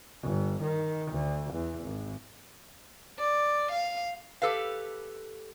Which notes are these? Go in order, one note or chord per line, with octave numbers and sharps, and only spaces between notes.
G1
D#3
D2
E2
G#1
D5
F5
G4 A4 B4 F5